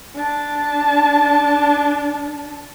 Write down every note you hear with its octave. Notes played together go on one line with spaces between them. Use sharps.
D4 A5